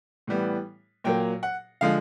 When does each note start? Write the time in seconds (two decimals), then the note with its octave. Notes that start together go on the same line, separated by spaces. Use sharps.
0.27 A2 E3 G3 B3
1.04 A#2 F#3 A#3 G5
1.43 F#5
1.81 D3 F3 G#3 F5